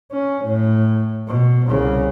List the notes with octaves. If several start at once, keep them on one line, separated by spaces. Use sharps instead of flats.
C#4
A2
B2
C2 C#3